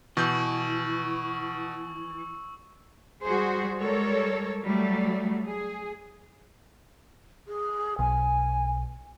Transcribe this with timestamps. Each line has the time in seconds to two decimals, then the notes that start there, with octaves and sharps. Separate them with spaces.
0.17 B2 E3 C#6 E6 G6
3.23 G3 F#4 G#4 C5
3.79 G3 G#3 A4 A#4 C#5
4.65 F#3 G3 A3
5.44 G#4
7.48 G#4
7.99 B1 G#5